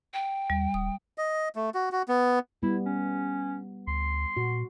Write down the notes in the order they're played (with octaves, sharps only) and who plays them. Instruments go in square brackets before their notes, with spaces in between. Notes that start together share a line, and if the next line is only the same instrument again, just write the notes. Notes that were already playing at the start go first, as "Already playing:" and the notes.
[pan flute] G5
[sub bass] D#2 [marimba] G3
[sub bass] D#1 [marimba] D#6
[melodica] D#5
A3
F#4
F#4
B3
[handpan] G3 B3 [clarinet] E4
[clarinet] C#4
[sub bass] D2 [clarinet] C6
[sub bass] A#2 [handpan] F#4